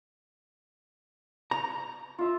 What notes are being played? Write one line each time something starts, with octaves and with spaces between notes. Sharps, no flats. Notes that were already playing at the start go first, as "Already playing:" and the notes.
A#5
F4 E5